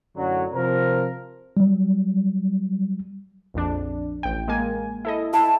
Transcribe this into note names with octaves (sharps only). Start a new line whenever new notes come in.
F#2 A2 D3 F#3
C3 F3 C4 A#4
F#3 G3
A#1 F2 D4
A1 G5
G#3 A#3 G#5
E4 A4 D#5
E4 A5